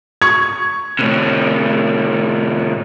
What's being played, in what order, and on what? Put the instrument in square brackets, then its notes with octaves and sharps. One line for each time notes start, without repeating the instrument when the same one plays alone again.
[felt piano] C#6 G#6
[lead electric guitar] A2 C3